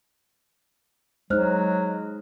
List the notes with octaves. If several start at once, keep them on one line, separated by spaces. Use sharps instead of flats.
F#3 G#3 D#4 C5 F6 F#6